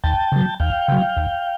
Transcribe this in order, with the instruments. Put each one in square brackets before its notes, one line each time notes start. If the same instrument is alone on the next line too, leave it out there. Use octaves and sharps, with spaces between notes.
[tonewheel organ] D#2 G5 A5
C#3 F#3
D#2 F5 G5
C#3 F#3
D#2